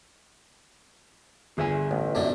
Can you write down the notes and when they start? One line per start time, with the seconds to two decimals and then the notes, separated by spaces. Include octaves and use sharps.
1.58 G1 G#4 E5 G#5
1.91 A1 A2
2.15 F#2 B2 A3 D4